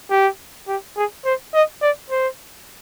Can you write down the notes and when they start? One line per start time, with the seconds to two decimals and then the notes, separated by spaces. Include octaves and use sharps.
0.10 G4
0.68 G4
0.96 G#4
1.25 C5
1.54 D#5
1.82 D5
2.10 C5